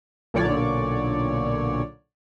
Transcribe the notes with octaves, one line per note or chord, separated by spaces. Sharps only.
B1 A#2 D3 C#5 D5